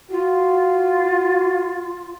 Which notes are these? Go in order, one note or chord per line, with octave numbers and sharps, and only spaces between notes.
F4 F#4